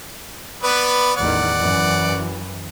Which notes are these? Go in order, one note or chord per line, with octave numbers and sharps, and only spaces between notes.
B3 B4 D5
A1 E2 D#3 D5 F#5
F#2 E3